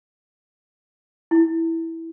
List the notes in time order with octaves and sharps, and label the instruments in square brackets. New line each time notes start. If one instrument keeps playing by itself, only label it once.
[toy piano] E4